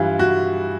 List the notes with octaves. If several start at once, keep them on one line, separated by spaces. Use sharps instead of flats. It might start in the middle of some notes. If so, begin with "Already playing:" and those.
Already playing: G2 E3 G3 F4
F#4